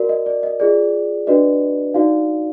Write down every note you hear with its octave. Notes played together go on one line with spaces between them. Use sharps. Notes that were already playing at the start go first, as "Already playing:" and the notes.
Already playing: F#4 A#4 D5
D#5
D5
D#5
F4 G#4 D5
D4 F#4 B4 D5 D#5
D#4 F#4 D5 F5